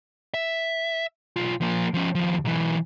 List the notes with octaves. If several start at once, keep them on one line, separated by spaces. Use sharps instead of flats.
E5
B1 F4
F3 A#3
F3 C#4
D#2 F3
B1 E3